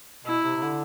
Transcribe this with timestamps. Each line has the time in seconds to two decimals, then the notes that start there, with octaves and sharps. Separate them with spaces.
0.25 B2 E4
0.43 C3
0.56 C3
0.62 D3